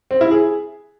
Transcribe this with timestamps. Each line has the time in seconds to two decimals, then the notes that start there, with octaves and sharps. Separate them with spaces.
0.11 C4
0.21 E4
0.31 G#4